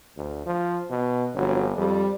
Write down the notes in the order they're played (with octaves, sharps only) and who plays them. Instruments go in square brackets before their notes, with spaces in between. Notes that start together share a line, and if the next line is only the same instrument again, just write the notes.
[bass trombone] D2
F3
B2
[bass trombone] G1 [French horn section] F2 D3 F#3
[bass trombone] F2 [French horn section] G3